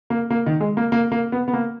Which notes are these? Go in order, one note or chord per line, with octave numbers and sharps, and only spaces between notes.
A#3
A#3
D#3
G#3
A#3
A#3
A#3
B3
B3
A#3